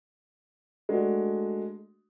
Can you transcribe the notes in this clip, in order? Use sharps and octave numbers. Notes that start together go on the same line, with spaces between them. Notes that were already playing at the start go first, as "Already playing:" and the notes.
G#3 A3 D4 F#4